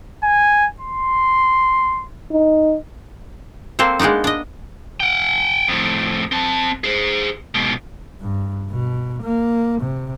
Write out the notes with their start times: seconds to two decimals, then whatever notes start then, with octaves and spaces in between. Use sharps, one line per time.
0.23 G#5
0.80 C6
2.32 D#4
3.79 A#3 C4 A4 C5
3.99 G#3 A#3 B3 D4 D#4
4.24 D4 D#5
5.00 F#5 G5
5.68 F2 A2
6.32 C4 A5
6.84 G#4 C5
7.55 G#2 B2
8.21 G2
8.70 B2
9.22 A#3
9.81 C3